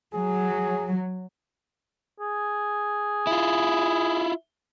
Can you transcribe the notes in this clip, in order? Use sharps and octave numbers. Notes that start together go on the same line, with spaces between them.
F#3 G#4
G#4
E4 F4